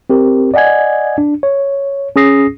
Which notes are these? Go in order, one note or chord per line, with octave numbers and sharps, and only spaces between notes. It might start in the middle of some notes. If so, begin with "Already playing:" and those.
C4 G4 A#4
D5 D#5 F#5 G#5 G#6
D4
C#5
C#4 G#4 D#6 A#6 C7